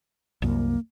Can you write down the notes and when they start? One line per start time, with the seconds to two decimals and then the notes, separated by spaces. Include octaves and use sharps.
0.42 C2 F#2 A#3